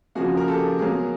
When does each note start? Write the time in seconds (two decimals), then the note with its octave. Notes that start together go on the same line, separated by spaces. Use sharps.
0.15 C#3 F3 A#3 F#4 G#4
0.37 A#4
0.48 G4 A4
0.79 B2 F#3 A#3 G#4 A#4